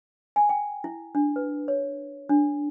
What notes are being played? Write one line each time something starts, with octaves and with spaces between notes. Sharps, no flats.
G#5
G5
E4
D4
B4
C#5
D4